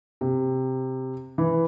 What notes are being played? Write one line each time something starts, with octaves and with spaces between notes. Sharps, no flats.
C3
E3